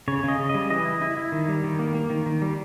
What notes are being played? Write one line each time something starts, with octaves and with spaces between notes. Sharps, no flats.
C#3 C#5
C#3 D#5
C#3
D#5
G3
E3 D#5
E4
E4
E4
D#3
G3
D#3
A#3
A#3
D#3
D#3
G3